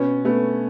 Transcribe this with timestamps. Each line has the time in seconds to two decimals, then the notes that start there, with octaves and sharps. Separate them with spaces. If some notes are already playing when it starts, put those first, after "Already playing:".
Already playing: B2 B3 C#4
0.25 A3 B3